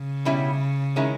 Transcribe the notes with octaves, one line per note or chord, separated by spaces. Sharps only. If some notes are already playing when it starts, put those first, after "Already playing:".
Already playing: C#3
B2 G3 C#4 E4
D#3 G#3 C#4 E4